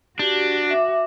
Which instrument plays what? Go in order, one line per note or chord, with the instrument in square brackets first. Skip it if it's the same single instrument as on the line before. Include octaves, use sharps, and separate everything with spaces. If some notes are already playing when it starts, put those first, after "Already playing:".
[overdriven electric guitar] D4 [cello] F#4 [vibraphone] G4
[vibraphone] E5 D6